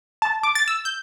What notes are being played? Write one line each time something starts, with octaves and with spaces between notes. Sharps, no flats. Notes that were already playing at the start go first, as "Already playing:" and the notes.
A5
D6
A6
E6
G6